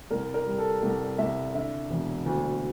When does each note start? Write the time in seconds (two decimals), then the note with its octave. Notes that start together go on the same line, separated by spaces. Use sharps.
0.10 C2 A#4
0.34 A#4
0.46 G3
0.58 A4
0.82 C2 A4
1.18 C2 E5
1.54 D3 E5
1.90 E1
2.26 D2